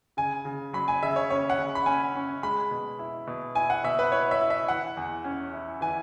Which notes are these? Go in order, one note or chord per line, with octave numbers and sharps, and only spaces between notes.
C#3 G#5
C#3
F#3 B5
G#5
C#3 E5
C#5
C#4 C#5
F#5
C#3
B5
C#4 G#5
C#4
G#3 B5
B2
E4
B2
E4 G#5
F#5
B2 E5
B4
E4 C#5
E5
E4
E5
E3 F#5
E2
C#4
E4
E3 G#5